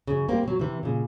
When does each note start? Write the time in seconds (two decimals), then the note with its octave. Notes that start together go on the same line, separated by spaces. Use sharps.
0.07 F#2 C#3
0.28 G3 A#3 C4
0.43 B2 F#3
0.59 C3 E3
0.83 A#2 C#3